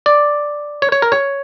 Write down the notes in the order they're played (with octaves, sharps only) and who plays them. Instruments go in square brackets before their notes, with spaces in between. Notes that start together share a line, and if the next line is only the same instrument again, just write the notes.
[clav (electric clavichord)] D5
C#5
C#5
A#4
C#5